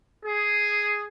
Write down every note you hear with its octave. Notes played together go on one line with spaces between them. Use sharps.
G#4